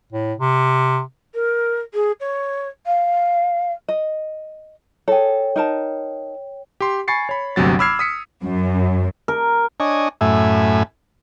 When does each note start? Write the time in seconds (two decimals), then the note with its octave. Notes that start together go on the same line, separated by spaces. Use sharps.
0.12 A2
0.38 C3
1.34 A#4
1.94 G#4
2.20 C#5
2.86 F5
3.88 D#5
5.08 G#4 A4 C#5 G5
5.56 D#4 A#4 A5
6.81 G4 C6
7.08 G#5 B5 C#6 A6 C7 C#7
7.29 C#5 B5
7.56 G1 D2 C3 F#3 A6
7.79 B5 D6 E6 F6 G#6 C7
7.99 D#6 B6 C#7
8.44 F#2
9.28 A#4
9.80 D4 C#5 D#5 G#5
10.21 F#2 A2 A3 E5 G#5